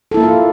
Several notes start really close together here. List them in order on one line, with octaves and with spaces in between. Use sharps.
A4 E4 A#3 A#4 F4